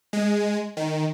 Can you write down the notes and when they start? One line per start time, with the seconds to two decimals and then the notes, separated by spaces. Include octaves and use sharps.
0.13 G#3
0.77 D#3